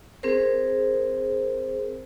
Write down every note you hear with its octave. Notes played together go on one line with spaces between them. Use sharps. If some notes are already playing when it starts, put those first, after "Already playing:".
C4 G#4 A#4 C5